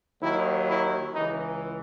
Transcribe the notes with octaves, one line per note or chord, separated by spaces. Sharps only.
D#2 D#3 F#3 E4
E4
C#2 C#3 E3 D#4